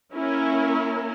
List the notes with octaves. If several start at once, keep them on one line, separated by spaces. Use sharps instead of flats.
A#3 C#4 E4 A#4